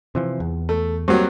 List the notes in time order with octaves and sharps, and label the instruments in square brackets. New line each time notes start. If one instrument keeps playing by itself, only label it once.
[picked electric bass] C3 E3 F3
E2
[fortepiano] A3
[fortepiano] G2 F#3 [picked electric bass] A#3 C4